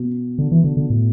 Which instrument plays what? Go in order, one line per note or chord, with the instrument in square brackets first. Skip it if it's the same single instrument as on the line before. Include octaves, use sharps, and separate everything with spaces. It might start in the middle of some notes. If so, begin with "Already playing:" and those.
Already playing: [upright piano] B2
[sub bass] D3
E3
D3
D3
A2